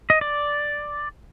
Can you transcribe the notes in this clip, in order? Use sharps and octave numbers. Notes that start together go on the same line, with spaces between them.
D#5
D5